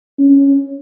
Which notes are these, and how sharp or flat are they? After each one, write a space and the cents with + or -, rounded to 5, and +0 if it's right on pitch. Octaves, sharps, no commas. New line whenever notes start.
C#4 +0